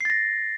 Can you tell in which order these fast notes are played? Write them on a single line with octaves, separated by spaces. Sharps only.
C7 A6 A#6